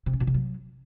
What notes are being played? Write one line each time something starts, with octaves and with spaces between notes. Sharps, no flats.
C3
C#4
B2
C3
F#3